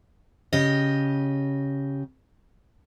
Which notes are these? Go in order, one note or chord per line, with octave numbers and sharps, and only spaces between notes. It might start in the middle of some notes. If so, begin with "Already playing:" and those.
C#3 G4 D#5